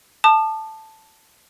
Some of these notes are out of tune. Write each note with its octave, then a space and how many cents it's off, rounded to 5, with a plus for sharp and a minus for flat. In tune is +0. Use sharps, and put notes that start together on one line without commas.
A5 +0 D#6 -45